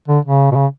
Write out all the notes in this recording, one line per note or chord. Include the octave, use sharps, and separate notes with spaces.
D3
C#3
B2
C#3